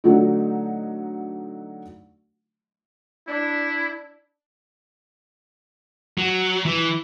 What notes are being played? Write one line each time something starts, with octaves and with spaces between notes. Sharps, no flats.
D3 F#3 A3 D#4
D4 E4
F#3
E3